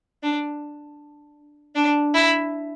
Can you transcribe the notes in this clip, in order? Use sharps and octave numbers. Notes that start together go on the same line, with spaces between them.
D4
D4
E4